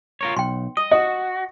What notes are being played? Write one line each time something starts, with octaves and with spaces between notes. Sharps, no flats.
F4 A#4 C#5
B1 G5 C6
D#5 D#6
F#4 D#5